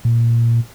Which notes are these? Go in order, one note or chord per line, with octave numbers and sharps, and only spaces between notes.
A#2